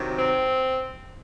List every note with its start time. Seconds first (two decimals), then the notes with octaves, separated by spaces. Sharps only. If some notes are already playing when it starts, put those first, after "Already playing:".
Already playing: C3 D#3 F#3
0.19 C4